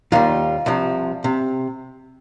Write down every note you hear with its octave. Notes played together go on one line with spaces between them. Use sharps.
D#2 D#3 G3 F4
C2 C3 F3
C3